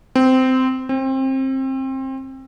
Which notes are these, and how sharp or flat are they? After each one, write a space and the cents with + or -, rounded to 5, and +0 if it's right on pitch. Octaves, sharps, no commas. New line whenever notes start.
C4 -15
C4 +25